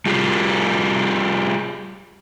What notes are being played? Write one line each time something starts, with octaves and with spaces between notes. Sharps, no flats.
G3 F4 G4 G#4